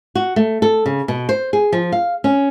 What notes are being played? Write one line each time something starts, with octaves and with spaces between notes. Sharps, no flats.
F#4
A3
A4
C#3
B2
C5
G#4
F3
F5
C#4